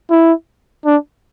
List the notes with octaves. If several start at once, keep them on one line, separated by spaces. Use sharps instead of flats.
E4
D4